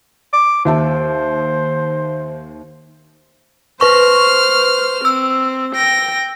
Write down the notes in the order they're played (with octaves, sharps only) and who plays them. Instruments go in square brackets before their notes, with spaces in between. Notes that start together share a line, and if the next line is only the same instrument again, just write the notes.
[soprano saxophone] D6
[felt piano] D#2 E5 A5 [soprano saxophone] C5
[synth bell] B4 C#6 [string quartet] C5 F6
[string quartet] C4 [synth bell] E6
[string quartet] G5 A#6